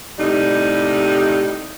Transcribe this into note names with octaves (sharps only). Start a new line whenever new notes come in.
A2 C3 G3 D#4